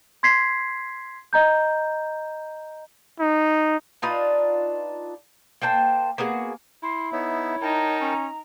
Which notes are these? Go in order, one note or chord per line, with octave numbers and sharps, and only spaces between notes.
C6 G#6 B6 C7
D#5 A#5 G6
D#4
D4 D#4 F4 B4
A#3 C5 G5 A5
A#3 B3 F#4 G#4
E4 C6
B3 D#4 C#5 E5
D#4 A#4 G5 A5
C#4 A#5